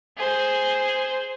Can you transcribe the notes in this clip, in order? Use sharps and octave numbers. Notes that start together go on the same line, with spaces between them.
G#4 C5